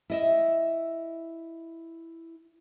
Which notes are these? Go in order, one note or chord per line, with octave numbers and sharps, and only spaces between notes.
E4 D#5 E5